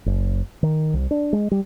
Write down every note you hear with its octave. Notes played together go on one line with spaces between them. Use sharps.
F#1
D#3
C2
D4
G#3
G3